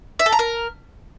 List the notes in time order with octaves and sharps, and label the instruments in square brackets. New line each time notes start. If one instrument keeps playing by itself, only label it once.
[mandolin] E5
A4
A#5
A#4